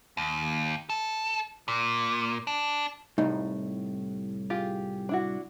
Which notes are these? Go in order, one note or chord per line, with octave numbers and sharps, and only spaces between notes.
D#2
A4
A#2
D4
C2 A2 D#4
F4 G4 G#4
D4 E4 F#4